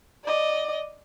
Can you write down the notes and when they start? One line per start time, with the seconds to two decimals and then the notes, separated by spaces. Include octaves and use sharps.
0.25 D5 D#5